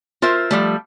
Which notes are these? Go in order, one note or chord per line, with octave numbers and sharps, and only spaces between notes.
F4 A#4 C5 E5
F3 G3 A3